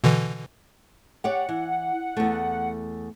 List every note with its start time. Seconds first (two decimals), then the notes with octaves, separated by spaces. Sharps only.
0.04 B2 D3 E3
1.24 G4 C#5 D5 F#5
1.49 E3
2.17 E2 A3